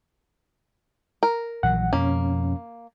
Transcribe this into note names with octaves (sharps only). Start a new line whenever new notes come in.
A#4
A#1 E3 F#3 F#5
F2 B2 F3 A#3 C#4